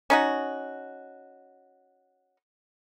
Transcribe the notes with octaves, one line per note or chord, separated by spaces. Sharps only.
C#4 D#4 F#4